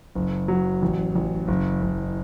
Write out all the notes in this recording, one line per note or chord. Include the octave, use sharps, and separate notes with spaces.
F#1
F#3
A1
A1
F#1
F#1